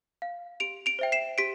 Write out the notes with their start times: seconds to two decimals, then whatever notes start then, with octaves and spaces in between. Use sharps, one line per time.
0.22 F5
0.60 G4 D7 F7
0.86 D7 F7
0.99 C5 E5 G5
1.12 C7 E7
1.38 G4 B6 D7